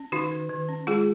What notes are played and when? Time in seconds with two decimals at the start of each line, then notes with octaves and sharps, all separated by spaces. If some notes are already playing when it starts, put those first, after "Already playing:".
Already playing: C#4
0.12 D#3 D#4 F#4
0.32 D#3
0.49 D#3
0.69 C#4
0.87 G#3 F4 G#4